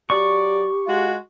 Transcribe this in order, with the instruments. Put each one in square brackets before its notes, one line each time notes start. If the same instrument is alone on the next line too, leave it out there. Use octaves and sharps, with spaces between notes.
[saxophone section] F#3 D5 [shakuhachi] G4 [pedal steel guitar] C#6
[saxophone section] G#3 F4 F#4